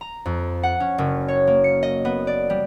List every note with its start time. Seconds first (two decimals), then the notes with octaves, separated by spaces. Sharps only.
0.01 A#5
0.25 F2
0.63 F#5
0.80 C#4
0.98 F#1
1.28 C#5
1.47 A#3
1.64 C#7
1.83 D#5
2.05 B3
2.27 D5
2.50 G3